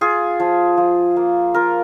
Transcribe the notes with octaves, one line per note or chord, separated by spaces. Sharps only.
F4 G#4
F3
F3
A#3
F4 A#4